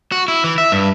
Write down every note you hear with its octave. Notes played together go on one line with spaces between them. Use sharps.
F#4
E4
E3
E5
G2